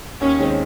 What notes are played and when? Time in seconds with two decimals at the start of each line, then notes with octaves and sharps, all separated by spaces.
0.21 D#2 C#4
0.39 D#3 G#3 C4